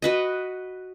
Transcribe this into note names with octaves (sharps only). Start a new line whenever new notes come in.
F#4 B4 D#5